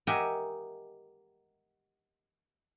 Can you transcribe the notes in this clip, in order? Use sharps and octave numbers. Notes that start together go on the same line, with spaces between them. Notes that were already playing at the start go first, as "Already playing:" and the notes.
G4 A#4 D#5 E5 F#5 G#5